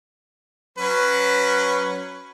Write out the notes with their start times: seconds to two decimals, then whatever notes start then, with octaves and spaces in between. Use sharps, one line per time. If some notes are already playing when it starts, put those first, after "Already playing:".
0.78 F#3 C#4 B4